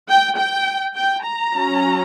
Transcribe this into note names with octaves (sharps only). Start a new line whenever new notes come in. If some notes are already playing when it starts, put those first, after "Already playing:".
G5
G5
G5
A#5
F#3 C#4